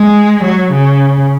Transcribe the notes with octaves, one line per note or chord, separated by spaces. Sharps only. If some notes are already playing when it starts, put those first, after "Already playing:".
Already playing: G#3
F#3
C#3